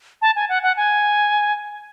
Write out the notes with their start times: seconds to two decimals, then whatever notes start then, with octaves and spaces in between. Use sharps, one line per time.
0.22 A5
0.36 G#5
0.49 F#5
0.63 F#5
0.77 G#5